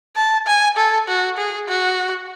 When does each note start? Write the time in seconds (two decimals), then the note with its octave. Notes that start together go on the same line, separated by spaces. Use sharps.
0.16 A5
0.47 G#5
0.77 A4
1.08 F#4
1.37 G#4
1.68 F#4